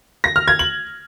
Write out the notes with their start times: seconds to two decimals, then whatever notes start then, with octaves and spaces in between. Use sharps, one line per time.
0.24 A#6
0.36 F6
0.48 G#6
0.59 F#7